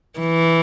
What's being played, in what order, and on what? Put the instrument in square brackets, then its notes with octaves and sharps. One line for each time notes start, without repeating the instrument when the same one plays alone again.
[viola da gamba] E3